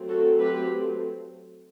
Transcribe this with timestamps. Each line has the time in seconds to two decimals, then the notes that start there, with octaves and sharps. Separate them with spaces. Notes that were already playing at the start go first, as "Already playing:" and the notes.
Already playing: F#3 A3 C4
0.09 F#4 A4
0.40 G4 B4